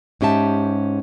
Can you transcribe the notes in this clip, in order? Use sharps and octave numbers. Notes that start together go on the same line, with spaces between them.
G#2 C#4 G4 E5 A5